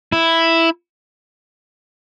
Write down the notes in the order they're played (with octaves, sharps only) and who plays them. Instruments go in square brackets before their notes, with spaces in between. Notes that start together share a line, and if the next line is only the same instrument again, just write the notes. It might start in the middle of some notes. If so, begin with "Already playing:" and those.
[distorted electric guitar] E4